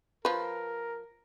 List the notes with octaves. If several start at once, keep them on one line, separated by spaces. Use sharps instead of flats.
F3 A#4 B4